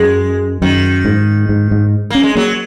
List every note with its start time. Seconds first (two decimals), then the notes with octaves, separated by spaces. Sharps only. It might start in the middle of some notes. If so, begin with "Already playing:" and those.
Already playing: F#2 G#3
0.62 F#2 D#3
1.05 G#2
1.49 G#2
1.71 G#2
2.10 A#3 C#4
2.23 G#3
2.35 F#3 A#3